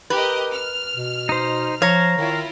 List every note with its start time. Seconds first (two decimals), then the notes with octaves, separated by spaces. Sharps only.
0.10 G4 A#4 B4 D#5
0.52 F6
0.96 B2
1.29 D#4 C5
1.82 F3 C5 C#5 F5 A#5
2.18 D#3 E4 F4